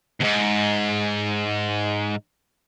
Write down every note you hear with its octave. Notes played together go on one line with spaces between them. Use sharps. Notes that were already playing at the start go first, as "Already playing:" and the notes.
D#2 G#2